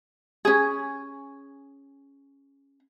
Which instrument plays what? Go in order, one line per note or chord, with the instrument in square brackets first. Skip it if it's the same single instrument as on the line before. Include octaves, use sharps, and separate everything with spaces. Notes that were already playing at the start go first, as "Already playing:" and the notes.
[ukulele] C#4 G#4